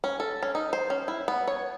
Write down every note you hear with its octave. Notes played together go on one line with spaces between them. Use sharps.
C#4
A4
C#4
D#4
C5
C#4
E4
B3
C#5